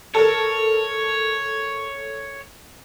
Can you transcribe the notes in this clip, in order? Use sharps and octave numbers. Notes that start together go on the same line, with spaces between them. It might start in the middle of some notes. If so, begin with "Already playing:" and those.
A4 A#4 C#5